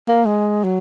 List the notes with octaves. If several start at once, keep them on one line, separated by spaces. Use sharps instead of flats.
A#3
G#3
F#3